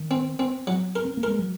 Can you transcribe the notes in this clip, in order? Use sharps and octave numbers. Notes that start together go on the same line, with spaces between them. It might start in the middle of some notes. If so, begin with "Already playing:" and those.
Already playing: D#3
C4
C4
F#3
A#4
C4
A#3
G#3 A#4
F#3